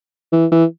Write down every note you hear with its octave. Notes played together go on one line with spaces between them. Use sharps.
E3
E3